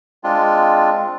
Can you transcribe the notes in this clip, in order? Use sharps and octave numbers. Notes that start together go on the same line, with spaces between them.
G#3 C4 D4 F4